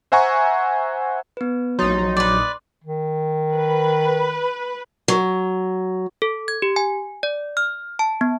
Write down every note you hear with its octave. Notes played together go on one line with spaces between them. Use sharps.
C5 E5 F#5 G#5 A#5 C#6
B3 B4
A#1 F#3 D#4 C6 A6
B4 D5
D#3
B4
F#3
A4
G#6
G4
G#5
D5
F6
A5
B3